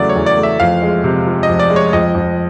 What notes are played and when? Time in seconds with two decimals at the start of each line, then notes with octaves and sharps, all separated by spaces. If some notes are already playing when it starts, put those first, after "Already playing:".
Already playing: E2 C#3 F#3 A3 D5
0.09 C#5
0.16 E2
0.26 D5
0.37 A3
0.43 E5
0.60 F2 F5
0.82 G#3
1.04 C3
1.27 F3
1.43 D#5
1.49 F2
1.60 D5
1.70 G#3
1.76 C#5
1.93 F2 D#5
2.15 F2